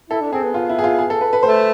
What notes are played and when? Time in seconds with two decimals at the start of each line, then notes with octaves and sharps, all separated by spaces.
0.10 E4 A4
0.21 D4
0.32 C4 G#4
0.43 B3
0.54 F4
0.69 E4
0.79 G#4
0.84 F4
0.99 G#4
1.10 A4
1.21 B4
1.33 B4
1.43 A3 C5